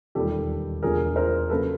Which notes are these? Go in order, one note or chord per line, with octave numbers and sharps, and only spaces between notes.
E1 D#2 D#3 G3 G4 A4
E1 D2 D3 G#4 A#4
A#4 C5
C#3 F#3 A#3 A4 B4